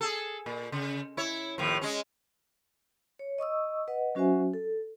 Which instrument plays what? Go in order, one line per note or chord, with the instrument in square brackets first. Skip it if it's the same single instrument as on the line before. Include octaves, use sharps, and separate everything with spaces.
[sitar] G#4 A4
A#2
C#3
E4 C#5
D#2 A2 F3
G#3 C#4
[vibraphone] C#5
D#5 C#6 D#6 E6
B4 D#5 F#5
F#3 C#4 F#4 C5 E5 G#5
A4